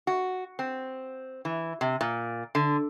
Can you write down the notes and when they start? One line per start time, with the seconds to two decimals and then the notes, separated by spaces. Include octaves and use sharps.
0.07 F#4
0.59 C4
1.45 E3
1.81 C3
2.01 A#2
2.55 D3